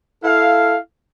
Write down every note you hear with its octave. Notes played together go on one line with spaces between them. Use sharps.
E4 A4 F5